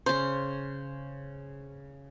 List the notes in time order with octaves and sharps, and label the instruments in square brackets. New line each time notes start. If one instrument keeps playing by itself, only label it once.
[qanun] C#3 C#4 [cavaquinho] C5